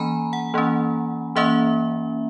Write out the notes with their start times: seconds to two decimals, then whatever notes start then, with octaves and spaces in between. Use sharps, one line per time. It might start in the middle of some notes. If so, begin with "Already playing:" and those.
Already playing: E3 A#3 C#4 G#5 A#5 B5
0.33 F#5
0.54 E3 A#3 C#4
1.36 E3 A#3 C#4 E5